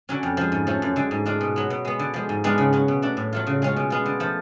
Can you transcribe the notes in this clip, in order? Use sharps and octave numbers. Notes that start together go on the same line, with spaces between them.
D3 F#3 C#4
F2
F3 G#3
G#2
F3 A3 C#4
F#2
D3 G#3
G#2
G#3 D4 F4
B2
F#3 B3
B2
G#3 B3
D3
F3 G#3
G#2
G#3 B3 D4 F4
C#3
F#3 C#4
B2
A3 D4
A2
F#3 A3 F4
C#3
G#3 C#4 F4
B2
G#3 B3 F4
D3
F3 A3